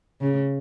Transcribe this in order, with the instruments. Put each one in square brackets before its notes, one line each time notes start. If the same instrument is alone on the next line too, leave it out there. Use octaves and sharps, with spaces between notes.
[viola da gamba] C#3